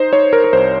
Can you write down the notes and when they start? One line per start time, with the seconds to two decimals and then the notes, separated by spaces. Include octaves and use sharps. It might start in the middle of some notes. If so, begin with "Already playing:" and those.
Already playing: D#4 C5
0.13 D#4 C#5
0.33 A#4
0.44 A#4
0.53 C2 C5